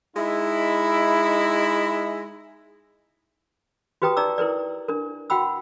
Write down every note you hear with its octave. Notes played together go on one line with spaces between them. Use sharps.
G#3 D#4 E4
F#4 G4 B4 G5 A#5 D#6
D#4 D5 A#5 D6 E6
E4 A#4 B4 D5
D4 A#4
F#4 F#5 G5 B5 E6